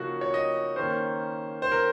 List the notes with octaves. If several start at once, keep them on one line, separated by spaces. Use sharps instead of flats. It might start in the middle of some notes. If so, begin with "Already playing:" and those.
Already playing: C#3 F3 A#3 D#4 F#4
C#5
D#5
D#3 A#3 C#4 C5
C5
A#4